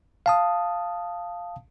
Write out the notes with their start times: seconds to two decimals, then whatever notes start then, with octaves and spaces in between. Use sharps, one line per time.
0.26 F5 A5 D#6